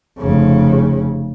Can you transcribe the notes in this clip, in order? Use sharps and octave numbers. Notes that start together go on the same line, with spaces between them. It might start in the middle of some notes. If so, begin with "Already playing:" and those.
F1 C#3